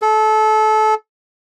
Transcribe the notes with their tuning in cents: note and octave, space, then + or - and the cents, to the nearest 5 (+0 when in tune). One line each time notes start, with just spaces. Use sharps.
A4 -25